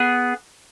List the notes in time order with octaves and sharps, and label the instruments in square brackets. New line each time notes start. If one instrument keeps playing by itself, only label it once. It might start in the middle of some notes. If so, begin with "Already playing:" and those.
Already playing: [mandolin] B3 G#4